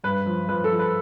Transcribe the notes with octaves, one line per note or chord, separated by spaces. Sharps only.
G2 B4
F3
F3 B4
A4
F3
B4